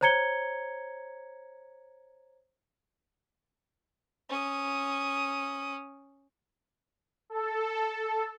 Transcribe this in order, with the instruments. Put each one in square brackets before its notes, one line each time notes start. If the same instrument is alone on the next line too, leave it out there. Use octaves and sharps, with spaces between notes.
[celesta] C5 C#5 A#5 G#6 C#7 G7
[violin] C#4 D#6
[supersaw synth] A4